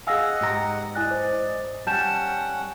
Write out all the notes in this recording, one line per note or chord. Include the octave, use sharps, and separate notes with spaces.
G#4 D#5 F5 F#5 G#5 E6 A#6
G#2 G4 A#5
E4 D5 D#5 G#5 F#6
C5
G3 C#4 F#5 G5 A5 G6 E7